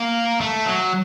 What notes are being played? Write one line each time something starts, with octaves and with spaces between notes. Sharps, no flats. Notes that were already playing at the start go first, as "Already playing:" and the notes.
Already playing: A#3
A3
F#3